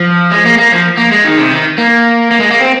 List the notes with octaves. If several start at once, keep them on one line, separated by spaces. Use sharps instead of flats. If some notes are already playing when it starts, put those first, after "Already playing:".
Already playing: F3
G#3
A#3
A#3
F3
A#3
G#3
D#3
C3
D#3
A#3
A#3
G#3
A#3
C4